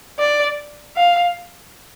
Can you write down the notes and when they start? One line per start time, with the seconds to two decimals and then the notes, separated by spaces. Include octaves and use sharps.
0.19 D5
0.96 F5